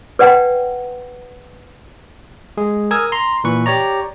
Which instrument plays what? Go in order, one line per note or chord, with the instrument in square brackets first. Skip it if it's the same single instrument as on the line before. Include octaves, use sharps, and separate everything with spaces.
[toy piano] B4 D5 F#5 G5 A5
[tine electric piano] G#3 G#4
A#4 G#5 D#6 E6 G#6
A#5 C6
A#2 E3 B4 C#6
G4 C#5 D5 A#5